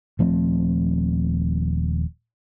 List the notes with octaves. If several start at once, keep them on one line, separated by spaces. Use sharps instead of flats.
D#1 F3 A3 C4